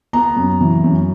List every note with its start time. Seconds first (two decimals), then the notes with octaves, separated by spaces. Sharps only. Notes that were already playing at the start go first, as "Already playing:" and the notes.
0.13 B3 A#5
0.36 F#2
0.61 E3
0.84 F#2